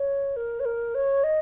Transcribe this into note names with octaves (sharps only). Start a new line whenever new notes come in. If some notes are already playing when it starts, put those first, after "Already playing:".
Already playing: C#5
A#4
C#5
A#4
C#5
D#5